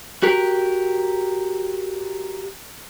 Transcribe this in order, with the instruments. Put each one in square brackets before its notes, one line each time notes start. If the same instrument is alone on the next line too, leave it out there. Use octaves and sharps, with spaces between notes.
[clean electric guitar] F#4 G4 A#4